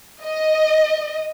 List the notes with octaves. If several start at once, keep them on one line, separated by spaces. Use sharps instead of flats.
D#5